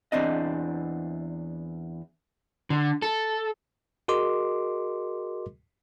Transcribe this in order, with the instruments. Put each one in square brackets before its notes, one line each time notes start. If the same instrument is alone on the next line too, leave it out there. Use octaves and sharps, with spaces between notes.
[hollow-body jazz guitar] E2 C4 D4 D#5
[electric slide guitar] D3
A4
[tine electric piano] F#4 G#4 A#4 D#5 C6 D6